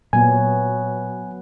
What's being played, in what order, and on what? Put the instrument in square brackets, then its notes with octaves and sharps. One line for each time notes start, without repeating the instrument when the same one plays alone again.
[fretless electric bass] A#2 [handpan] F#3 B3 [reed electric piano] G#5